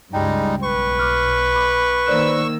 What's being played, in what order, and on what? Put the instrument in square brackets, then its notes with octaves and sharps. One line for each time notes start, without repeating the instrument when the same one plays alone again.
[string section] C#2 G2 [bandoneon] G3 G#3 D#4 [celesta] G5
[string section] B1 [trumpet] B4 [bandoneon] C#6
[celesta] D6 F6
B5 D6
[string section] D#3 A#3 E6 [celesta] C5 D5 F#6